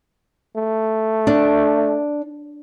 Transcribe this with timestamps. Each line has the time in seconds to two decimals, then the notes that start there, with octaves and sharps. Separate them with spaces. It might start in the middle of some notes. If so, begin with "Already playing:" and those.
0.57 A3
1.27 D4